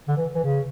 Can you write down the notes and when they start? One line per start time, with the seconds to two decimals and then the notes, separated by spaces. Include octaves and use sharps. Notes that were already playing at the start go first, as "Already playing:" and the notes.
0.08 D3
0.17 E3
0.35 E3
0.44 C#3